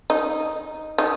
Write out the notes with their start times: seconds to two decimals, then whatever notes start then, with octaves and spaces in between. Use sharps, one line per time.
0.10 D#4
0.98 D#4